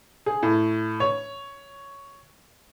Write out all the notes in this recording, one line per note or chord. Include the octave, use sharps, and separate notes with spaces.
G#4
A2
C#5